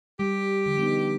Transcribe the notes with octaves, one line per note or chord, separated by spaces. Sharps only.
G3 G4
D3 F3
B3 D#4